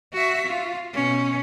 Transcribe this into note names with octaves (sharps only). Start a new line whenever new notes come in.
F#4 E5
F4
B2 C#4